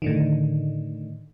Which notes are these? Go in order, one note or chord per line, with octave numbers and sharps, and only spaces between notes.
A2 D3 D#3